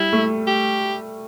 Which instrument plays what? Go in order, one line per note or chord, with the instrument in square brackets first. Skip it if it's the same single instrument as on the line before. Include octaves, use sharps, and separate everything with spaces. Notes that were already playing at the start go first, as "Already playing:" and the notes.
Already playing: [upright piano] G3 [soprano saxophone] E4
[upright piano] A3
[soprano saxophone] G4